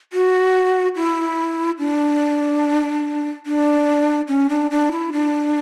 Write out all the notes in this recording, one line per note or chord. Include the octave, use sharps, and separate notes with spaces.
F#4
E4
D4
D4
C#4
D4
D4
E4
D4